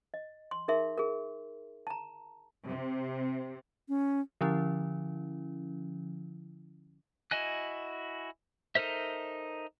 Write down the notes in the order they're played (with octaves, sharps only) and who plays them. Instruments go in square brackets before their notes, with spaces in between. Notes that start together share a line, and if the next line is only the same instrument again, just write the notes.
[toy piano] D#5
C6
D#4 G#4 A#4 E5 C6
G#4 A#4
A5 A#5
[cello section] C3
[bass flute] C#4
[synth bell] D3 F3 C#4 E4
[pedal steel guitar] E4 F#4 D#5 G#5 F#6
D#4 A4 A#4 C5 E5